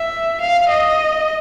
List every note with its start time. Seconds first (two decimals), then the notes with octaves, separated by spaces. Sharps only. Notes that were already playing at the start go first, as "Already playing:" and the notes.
Already playing: E5
0.41 F5
0.70 D#5